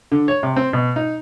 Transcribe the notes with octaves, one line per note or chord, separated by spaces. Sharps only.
D3
C#5
C3
C4
B2
D#4